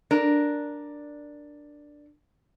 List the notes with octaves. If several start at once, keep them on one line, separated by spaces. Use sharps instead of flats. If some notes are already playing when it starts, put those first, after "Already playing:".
D4 A#4